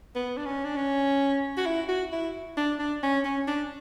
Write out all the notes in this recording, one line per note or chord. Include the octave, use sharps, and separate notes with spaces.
B3
D4
C#4
D4
C#4
F#4
E4
F#4
E4
D4
D4
C#4
C#4
D4